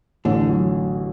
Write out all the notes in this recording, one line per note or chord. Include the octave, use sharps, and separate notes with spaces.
A1 D3
F#3